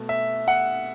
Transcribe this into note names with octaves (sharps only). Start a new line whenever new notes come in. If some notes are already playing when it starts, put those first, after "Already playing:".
Already playing: B2 A3
E5
F#5